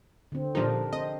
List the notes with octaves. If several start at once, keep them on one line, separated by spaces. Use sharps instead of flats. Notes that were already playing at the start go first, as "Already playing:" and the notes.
D3 C4
A#2 F3 D4 D#4 G4 A#4
C4 C5 D#5